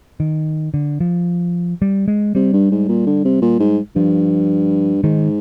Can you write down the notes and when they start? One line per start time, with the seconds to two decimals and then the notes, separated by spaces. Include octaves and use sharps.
0.20 D#3
0.74 D3
1.00 F3
1.82 G3
2.08 G#3
2.35 C3 G3
2.53 G2
2.71 G#2
2.88 A#2
3.06 D3
3.25 C3
3.42 A#2
3.60 G#2
3.96 G2 F3
5.03 G#2 D#3